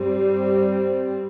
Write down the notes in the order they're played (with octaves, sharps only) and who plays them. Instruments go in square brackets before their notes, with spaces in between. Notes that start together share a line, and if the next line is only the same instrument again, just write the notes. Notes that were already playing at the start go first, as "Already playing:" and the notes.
Already playing: [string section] G2 G3 C4